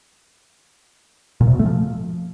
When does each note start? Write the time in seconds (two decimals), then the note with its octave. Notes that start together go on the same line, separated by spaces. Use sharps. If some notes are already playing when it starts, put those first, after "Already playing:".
1.41 A#2
1.47 C3
1.53 B2
1.59 A3
1.66 F3